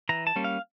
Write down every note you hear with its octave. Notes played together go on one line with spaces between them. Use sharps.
E3 A#5
A5
G3 A#3 C#4
F5